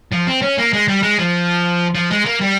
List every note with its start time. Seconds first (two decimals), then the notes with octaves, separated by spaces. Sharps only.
0.12 F3
0.27 C4
0.42 C#4
0.58 A#3
0.73 G#3
0.88 G3
1.03 G#3
1.19 F3
1.95 F3
2.10 G#3
2.25 A#3
2.41 G3